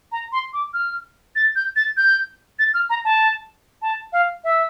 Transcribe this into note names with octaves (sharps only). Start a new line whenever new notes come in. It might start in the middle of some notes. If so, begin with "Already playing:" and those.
A#5
C6
D6
F6
A6
G6
A6
G6
A6
F6
A#5
A5
A5
F5
E5